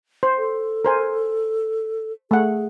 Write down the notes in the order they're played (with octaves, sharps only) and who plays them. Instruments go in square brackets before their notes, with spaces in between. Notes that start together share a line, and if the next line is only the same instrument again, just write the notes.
[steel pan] C5
[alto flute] A4
[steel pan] A#4 C5 G#5
[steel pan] A3 F#5 [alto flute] G#4